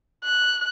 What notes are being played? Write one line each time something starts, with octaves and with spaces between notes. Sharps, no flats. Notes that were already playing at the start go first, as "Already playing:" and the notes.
F#6